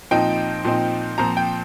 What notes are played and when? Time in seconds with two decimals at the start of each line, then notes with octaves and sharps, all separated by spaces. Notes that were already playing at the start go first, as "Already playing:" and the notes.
0.11 A#2 F3 C4 D#4 G5
0.65 A#2 F3 C4 D#4
1.18 A#2 F3 C4 A#5
1.37 G5